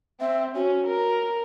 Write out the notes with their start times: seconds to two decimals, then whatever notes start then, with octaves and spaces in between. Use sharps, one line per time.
0.20 C4 E5
0.55 C#4 F#4
0.87 A#4